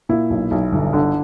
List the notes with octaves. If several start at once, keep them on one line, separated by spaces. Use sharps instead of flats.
A#2 E4
B1
B1
G1
D3